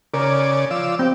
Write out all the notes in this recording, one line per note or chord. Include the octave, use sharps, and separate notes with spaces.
C#3 A#4 D5
F3 D5 E6
C4 G4